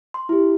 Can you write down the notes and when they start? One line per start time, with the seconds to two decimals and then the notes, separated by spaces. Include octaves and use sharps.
0.14 C6
0.29 E4 G4